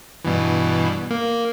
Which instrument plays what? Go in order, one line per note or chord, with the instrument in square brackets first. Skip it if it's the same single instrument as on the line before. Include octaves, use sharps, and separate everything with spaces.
[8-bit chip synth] G2 B2 E3
A#3